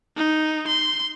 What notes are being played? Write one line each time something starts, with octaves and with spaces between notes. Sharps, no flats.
D#4
C6